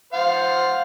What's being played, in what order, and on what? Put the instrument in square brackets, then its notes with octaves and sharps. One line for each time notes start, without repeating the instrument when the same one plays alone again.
[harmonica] C5 F5 F#5